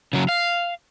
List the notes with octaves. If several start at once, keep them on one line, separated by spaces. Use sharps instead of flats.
C#3 F#3
F5